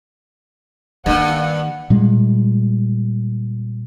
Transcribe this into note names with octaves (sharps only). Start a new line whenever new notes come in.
G2 D#3 A#3 F#5
A#2 G3 G#3